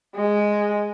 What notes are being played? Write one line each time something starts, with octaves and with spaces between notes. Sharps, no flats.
G#3